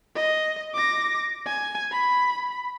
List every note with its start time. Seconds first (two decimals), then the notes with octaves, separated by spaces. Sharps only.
0.16 D#5
0.74 D6 A#6
1.46 G#5
1.91 B5